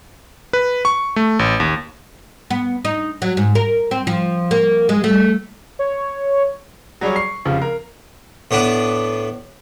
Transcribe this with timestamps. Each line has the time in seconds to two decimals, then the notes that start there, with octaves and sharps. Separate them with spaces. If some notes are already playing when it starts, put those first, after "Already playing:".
0.53 B4
0.85 C#6
1.16 A3
1.39 A1
1.60 D#2
2.51 B3
2.85 D#4
3.22 F#3
3.37 G#2
3.55 A#4
3.91 C4
4.07 F3
4.51 A#3
4.89 G#3
5.04 A3
5.79 C#5
7.01 F#3 G3 G#4 C#5
7.16 C#6 C7
7.45 F1 C#3 F3
7.62 A#4
8.51 A2 B3 D4